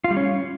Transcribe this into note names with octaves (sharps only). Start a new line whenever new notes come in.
F4
G3
C#4